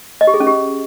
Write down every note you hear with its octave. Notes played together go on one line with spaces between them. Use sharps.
D#5
G4
G#4
C#4
G4